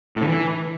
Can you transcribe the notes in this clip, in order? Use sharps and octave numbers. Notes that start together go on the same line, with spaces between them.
A2
D3
E3